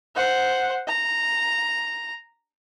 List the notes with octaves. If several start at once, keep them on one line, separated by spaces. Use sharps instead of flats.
C5 F#5
A#5